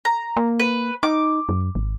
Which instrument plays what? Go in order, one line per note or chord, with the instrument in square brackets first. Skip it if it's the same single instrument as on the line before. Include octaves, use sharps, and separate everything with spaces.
[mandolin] A#5
[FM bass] A#3
[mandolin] B4
[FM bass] D#4 [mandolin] D6
[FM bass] F#2
G#1